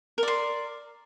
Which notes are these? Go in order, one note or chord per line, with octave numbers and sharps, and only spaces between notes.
A#4 D5 C6